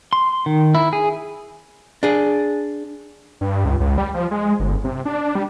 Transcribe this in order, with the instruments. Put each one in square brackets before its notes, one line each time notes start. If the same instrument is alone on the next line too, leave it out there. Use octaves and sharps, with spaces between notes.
[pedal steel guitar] C6
D#3
E4
G#4
[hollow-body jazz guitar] D4 G#4
[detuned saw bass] G2
C#2
C#2
G3
F3
G#3
G1
C3
D4
G3